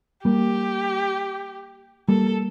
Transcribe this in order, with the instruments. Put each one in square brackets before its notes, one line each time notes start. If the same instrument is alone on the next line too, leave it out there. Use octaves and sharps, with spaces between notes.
[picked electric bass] G3 A#3 [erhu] G4
[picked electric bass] G3 A#3 [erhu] A4